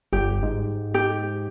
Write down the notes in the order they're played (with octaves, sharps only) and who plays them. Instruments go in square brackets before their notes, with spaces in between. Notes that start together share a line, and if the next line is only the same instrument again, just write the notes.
[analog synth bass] G1 [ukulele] G4
[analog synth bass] G#2
[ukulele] G4